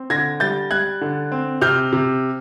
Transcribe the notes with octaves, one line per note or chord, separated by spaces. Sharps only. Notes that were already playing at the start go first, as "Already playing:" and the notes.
Already playing: C4
D3 G#6 A#6
G3 G6 A6
G3 F#6 G#6
D3
C4
C3 F6 G6
C3